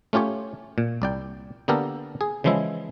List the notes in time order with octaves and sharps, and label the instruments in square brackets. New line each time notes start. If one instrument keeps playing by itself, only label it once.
[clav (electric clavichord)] A3 C#4 F4 G4 C#5
A#2
C2 D5 G5
D3 A#3 B3 G4 A4 A#4
G#4
C#3 E3 F3 G#3 E4